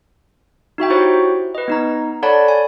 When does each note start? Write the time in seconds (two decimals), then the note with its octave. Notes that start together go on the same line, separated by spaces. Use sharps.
0.78 D#4 F#4 E5 G5
0.90 E4 F#4 G4 C5 C#5
1.55 B4 D#5
1.68 B3 D#4 A#5
2.23 A4 C#5 D5 F#5 A5 B5
2.48 G#5